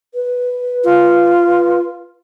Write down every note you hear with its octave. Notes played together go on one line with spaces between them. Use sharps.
B4
F4